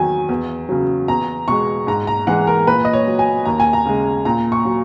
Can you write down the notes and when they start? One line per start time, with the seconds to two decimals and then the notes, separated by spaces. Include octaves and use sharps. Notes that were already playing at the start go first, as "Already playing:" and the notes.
Already playing: E2 D#3 F#3 G#5
0.29 E2
0.69 C#3 F#3
1.08 E2 A#5
1.48 B2 G#3 C#6
1.87 G#2 A#5
2.07 A#5
2.27 E3 G#3 F#5
2.47 A#4
2.67 A#2 B4
2.85 D#5
2.93 C#5
3.06 F#3
3.19 G#5
3.45 D#2 A#5
3.60 G#5
3.73 A#5
3.86 C#3 G#3
4.25 A#2 A#5
4.52 C#6
4.65 F#3